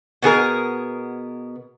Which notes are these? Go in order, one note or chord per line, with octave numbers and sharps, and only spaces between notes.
B2 B3 G#4 A#4